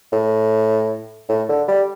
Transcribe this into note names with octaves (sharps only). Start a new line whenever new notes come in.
A2
A2
D3
G3